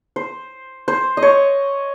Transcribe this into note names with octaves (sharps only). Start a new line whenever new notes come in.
C5
C5
D#5
C#5